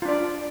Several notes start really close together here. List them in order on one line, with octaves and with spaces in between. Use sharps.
F4 D4 D5